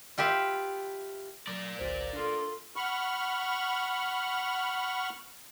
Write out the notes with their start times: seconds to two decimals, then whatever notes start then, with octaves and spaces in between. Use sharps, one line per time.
0.18 F4 G4 B4 E5
1.47 F#3 A#4 D5
1.79 G#1 C#2 C5
2.13 D4 F4 A4
2.76 F#5 B5 C#6 F6